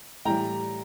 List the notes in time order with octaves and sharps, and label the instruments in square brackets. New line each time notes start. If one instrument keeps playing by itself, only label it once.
[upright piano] A2 E3 G3 G5 A#5